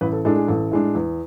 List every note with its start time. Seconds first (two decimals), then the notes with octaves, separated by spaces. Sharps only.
0.01 A1 B4
0.13 A4
0.25 A2 G#3 D4 A4
0.36 G#4
0.48 A1 A4
0.71 A2 G#3 D4
0.95 E2